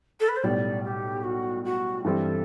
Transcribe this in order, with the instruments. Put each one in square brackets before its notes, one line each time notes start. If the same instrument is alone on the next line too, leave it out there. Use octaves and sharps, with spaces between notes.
[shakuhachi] A4
B4
C5
[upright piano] B1 A2 G3 [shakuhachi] D5
[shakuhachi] G4
F#4
F#4
[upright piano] G2 E3 G3 C4 [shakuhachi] A4